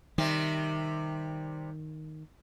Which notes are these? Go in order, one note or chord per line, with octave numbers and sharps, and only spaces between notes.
C3 D#3 G3